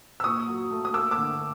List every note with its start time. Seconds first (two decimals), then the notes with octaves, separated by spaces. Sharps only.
0.20 E6
0.24 A#2 C#6 D#6
0.47 F#3
0.71 A3
0.85 D#6
0.94 A#3 D6 E6
1.11 D6 E6
1.18 D3